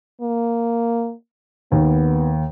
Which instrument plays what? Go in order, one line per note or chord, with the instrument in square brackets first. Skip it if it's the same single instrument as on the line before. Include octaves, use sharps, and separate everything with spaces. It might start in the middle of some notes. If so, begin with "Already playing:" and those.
[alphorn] A#3
[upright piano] D#2 [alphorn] B3